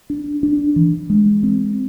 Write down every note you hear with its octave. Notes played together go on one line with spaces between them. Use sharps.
D4
D4
E3
G#3
C4